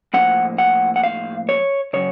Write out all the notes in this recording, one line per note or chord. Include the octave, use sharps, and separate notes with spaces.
A2 F3 A#3 F#5
F#5
F#5
F5
C#5
C#3 F#3 C#5